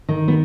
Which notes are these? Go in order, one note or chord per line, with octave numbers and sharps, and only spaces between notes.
D#3
B3